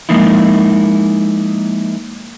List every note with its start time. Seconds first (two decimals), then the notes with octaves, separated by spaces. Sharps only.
0.09 F3 G#3 A#3 D#4 E4